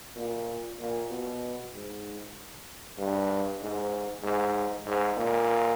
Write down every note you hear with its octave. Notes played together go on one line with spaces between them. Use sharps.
A#2
A#2
B2
G#2
G2
G#2
G#2
G#2
A#2